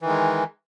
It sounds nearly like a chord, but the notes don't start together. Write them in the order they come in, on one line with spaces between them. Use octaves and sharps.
E3 D#3 G#3